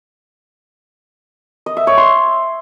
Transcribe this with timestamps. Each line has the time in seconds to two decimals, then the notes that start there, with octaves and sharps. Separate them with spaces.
1.66 D#5
1.77 E5
1.87 C#5
1.97 C6